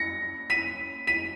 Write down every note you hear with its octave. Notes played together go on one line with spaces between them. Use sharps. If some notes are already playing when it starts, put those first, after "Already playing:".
Already playing: A#6 C#7
B6 D#7
B6 D#7